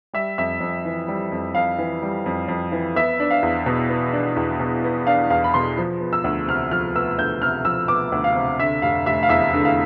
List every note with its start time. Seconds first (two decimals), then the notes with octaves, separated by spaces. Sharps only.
0.13 G3 E5
0.38 F2 E5
0.60 F2
0.85 E3
1.08 G3
1.32 F2
1.55 F2 F5
1.78 E3
2.02 G3
2.26 F2
2.48 F2
2.72 E3
2.96 B3 E5
3.20 D4
3.31 F5
3.43 E2
3.66 B2
3.89 B3
4.13 D4
4.36 E2
4.60 B2
4.84 B3
5.07 D4 F5
5.30 E2 F5
5.44 B5
5.54 B2 C6
5.78 F3
6.00 B3
6.13 E6
6.24 D2
6.48 C3 F6
6.71 F3 F6
6.96 B3 E6
7.18 D2 G6
7.42 C3 F6
7.65 F3 E6
7.88 B3 D6
8.12 D2
8.24 F5
8.35 C3
8.60 D3 E5
8.82 F1 F5
9.06 F1 E5
9.23 F5
9.29 E2 E5
9.54 D3
9.65 F5